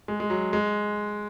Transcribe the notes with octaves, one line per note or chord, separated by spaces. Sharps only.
G#3
G#3
F#3
G#3